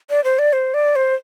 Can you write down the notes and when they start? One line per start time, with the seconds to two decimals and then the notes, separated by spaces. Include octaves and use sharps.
0.10 D5
0.24 C5
0.39 D5
0.53 C5
0.74 D5
0.96 C5